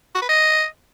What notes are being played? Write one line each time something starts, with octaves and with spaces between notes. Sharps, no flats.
F#4
B4
D#5